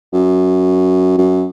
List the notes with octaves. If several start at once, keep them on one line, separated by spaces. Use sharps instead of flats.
F#2
F#2